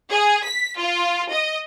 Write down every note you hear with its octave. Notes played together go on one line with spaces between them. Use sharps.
G#4
B6
F4
D#5